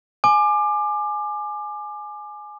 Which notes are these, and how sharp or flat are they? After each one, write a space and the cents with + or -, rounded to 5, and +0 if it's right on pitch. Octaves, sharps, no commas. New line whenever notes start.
G#5 +15 D6 +25